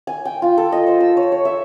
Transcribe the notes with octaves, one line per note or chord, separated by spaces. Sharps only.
G#5
G5
F4
A4
D#5
C5
E6
C#5
C#5
E5